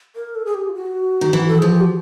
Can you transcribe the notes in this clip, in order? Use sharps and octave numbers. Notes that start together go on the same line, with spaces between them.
A#4
A4
G#4
G4
F4
F#4
D#3
E3
A4
F3 G#4
G4
F#4